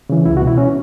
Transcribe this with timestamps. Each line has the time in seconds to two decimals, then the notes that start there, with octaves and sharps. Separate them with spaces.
0.09 C#3 E3
0.26 C#2 E4
0.37 F#4
0.42 B2
0.47 E4
0.58 C#4